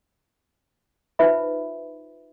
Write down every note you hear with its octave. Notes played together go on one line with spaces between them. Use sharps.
D#4 F4 B4 C5 E5 B5